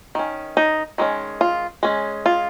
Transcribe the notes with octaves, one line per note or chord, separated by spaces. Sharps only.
D#3 C#4
D#4
D#3 G#3 C#4
F4
G#3 C#4
F4